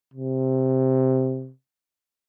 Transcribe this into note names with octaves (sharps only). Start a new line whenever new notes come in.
C3